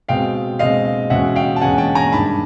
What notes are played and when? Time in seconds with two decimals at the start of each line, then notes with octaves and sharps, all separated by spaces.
0.08 B2 G#3 C4 F5 G5
0.59 B2 G#3 C4 D#5 F5
1.10 E2 B2 G#3 C#4 E5 F#5
1.36 F5 G5
1.56 A5
1.61 E2 B2 G#3 C#4 F#5 G#5
1.78 G5 A5
1.95 G#5 A#5
2.12 G2 D#3 G#3 A5 B5